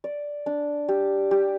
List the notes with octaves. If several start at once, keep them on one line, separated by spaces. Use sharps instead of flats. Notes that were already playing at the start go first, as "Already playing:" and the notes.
D5
D4
G4
G4